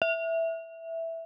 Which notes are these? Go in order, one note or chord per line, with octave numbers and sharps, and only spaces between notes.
E5